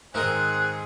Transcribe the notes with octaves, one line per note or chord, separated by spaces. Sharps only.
G#2 D#3 C4 G#4 A#4 D#5 F#6